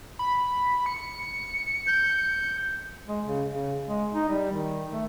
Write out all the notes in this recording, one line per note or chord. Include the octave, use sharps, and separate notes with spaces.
B5
C#7
G6
G#3
C#3
C#3
G#3
D#4
G3
D#3
A3